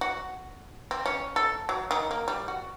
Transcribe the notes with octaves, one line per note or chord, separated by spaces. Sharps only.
F#4
C4
C#4
A4
F#3
D#3
A#3
G3
F#4